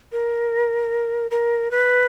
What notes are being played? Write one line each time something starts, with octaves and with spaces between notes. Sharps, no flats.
A#4
A#4
B4